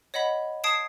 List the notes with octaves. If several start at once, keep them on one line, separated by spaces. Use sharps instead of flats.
C#5 D#5 F#5 B5 B6
A5 D#6 G#6 C7 D7 E7